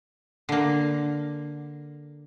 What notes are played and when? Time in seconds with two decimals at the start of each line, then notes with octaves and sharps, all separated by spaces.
0.49 D3 A#3